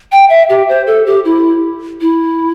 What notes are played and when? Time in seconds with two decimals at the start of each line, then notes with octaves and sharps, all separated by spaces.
0.12 G5
0.30 E5
0.49 G4
0.69 C5
0.87 A4
1.06 G4
1.25 E4
2.01 E4